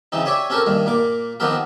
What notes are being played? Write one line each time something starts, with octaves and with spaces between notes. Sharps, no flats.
C#3 E3 C4 D#4
G4 C#5 D5 E5 G#5
C4 C#4 G4 A4 A#4
G2 D#3 A#3
A#2 A#3 D6
D#3 F3 B3 C4 G4 A#4